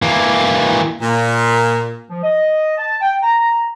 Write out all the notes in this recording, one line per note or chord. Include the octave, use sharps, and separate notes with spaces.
E3 A#3
A#2
F3
D#5
A5
G5
A#5